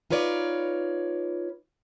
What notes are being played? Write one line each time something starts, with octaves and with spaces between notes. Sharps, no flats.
D#4 F4 B4 C#5 D5